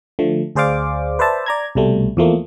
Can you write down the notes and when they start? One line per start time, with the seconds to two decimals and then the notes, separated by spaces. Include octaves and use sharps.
0.19 D3 F3 A3
0.55 D2 G#4 C5 D5 F5 D6
1.19 B4 C5 D5 E5 A5
1.46 D5 A#5 G#6
1.75 C2 B2 G3 A3
2.17 E2 F3 A3 A#3